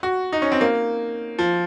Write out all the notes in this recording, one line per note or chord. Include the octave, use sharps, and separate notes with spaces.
F#4
D#4
C#4
C4
A#3
F3